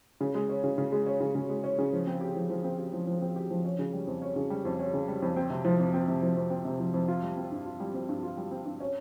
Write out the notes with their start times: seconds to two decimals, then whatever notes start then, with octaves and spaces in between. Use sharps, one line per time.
0.21 C#3
0.35 G#3
0.49 C#4
0.64 C#3
0.78 C#3
0.92 G#3
1.06 C#4
1.21 C#3
1.35 C#3
1.49 G#3
1.64 C#4
1.78 C#3
1.93 F3
2.07 C4
2.21 G4
2.36 F3
2.50 F3
2.64 C4
2.78 G4
2.93 F3
3.07 F3
3.22 C4
3.36 G4
3.50 F3
3.65 C#4
3.79 C#3
3.93 G3
4.07 F2
4.22 C#4
4.36 C#3
4.50 G3
4.65 F2
4.79 C#4
4.94 C#3
5.08 G3
5.22 F2
5.36 C4
5.50 C3
5.65 F3
5.80 F2
5.94 C4
6.08 C3
6.22 F3
6.37 F2
6.50 C4
6.65 C3
6.80 F3
6.94 F2
7.08 F4
7.23 G3
7.37 C4
7.51 G2
7.66 F4
7.80 G3
7.94 C4
8.09 G2
8.23 F4
8.37 G3
8.51 C4
8.65 G2
8.80 C#4